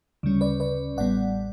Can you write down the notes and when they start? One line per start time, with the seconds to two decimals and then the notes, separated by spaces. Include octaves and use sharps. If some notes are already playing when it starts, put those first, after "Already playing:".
0.23 D2 C#3 G3 C#4
0.41 B4 D5
0.60 B4 D5
0.97 A1 A2 G3 B3 D5 F#5